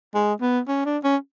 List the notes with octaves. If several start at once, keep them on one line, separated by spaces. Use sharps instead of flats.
G#3
B3
C#4
D4
C#4